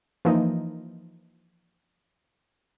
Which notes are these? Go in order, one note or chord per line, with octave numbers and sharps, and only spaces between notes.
E3 F3 A#3 D#4